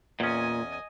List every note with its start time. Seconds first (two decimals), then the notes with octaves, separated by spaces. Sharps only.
0.20 E2 A#2 C#4 D#5 G#5